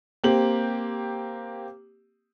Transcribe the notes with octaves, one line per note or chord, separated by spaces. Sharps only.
A#3 C4 G4 F#7